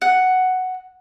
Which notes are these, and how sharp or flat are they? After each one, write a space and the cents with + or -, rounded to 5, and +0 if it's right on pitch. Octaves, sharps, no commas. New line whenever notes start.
F#5 +5